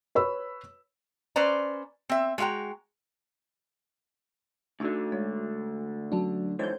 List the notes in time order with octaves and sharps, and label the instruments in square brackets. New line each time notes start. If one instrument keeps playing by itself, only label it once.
[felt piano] B4 C#5 B5 E6
[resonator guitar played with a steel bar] C#4 B4 C5 D5 A#5
C4 E5
G#3 F#4 F5 G5 A#5
[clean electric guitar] D2 D3 [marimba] D4 D#4 F#4
[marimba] G#3 D4 C#5
[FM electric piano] F#3 D4 [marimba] C#4 A5
[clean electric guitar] G#2 E3 G3 [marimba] A4 C#5 F5 [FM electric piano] C5 G6